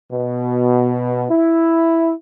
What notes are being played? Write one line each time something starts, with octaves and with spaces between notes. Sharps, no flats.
B2
E4